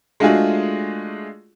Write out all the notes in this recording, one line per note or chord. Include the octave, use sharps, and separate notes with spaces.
G#3 A3 D4 F4 F#4 G#4